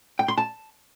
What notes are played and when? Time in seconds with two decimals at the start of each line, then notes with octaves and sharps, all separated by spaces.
0.19 G5
0.28 C6
0.38 A5